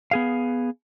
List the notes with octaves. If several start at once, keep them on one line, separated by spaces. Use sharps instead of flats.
B3 G#4 F5